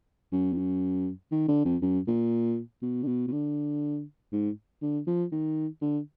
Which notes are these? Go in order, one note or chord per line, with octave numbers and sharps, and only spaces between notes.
F#2
F2
F#2
D#3
D3
F2
F#2
A#2
B2
D3
B2
B2
D3
G#2
D3
F3
D#3
D3